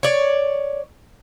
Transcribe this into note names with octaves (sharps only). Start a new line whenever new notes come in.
C#5 D5